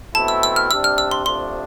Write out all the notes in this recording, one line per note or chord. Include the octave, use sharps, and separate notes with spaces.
B2 A3 C4 E4 A5
E6
E6
F6
C3 G3 D4 E6
F6
E6
C6
C3 F3 A3 D4 C6